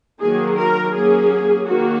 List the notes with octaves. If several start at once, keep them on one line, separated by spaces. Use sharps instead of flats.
D#3 F#3 A#3 G#4
A#4
F#3 A#3 C#4 G#4
D#3 A#3 F#4